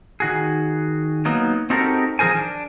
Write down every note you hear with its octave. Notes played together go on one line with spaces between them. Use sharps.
D#3 F#4 G#4
F#3 A#3 B3 D#4
C4 D#4 F#4 G4 A4 A#4
D#3 F3 G#4 A#4 C5 G#5
D4